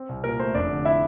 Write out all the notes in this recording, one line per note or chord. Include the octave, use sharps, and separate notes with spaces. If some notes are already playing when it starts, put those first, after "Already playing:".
Already playing: C4
C2
A#2 A#4
A3 C5
F1 D4 D5
D3
E4 E5